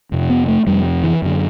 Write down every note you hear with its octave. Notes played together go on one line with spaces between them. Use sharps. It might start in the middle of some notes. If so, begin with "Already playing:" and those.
F2 C3
B3
A3
F2 C3 G3
E3
F#2 D3